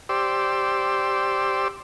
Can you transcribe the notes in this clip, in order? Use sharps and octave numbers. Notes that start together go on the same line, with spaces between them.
G4 C5 D5 E6